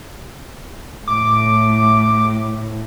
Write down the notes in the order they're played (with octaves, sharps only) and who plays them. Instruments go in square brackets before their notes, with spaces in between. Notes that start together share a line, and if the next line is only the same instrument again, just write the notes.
[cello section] A2 [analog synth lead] D6